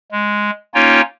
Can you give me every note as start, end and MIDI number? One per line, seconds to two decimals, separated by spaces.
0.12 0.50 56
0.74 1.01 58
0.74 1.01 61
0.74 1.01 63
0.74 1.01 65
0.74 1.01 73
0.74 1.01 79